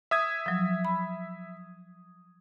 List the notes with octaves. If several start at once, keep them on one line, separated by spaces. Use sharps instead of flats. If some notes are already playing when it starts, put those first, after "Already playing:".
E5 D#6 G#6
F3 F#3
B5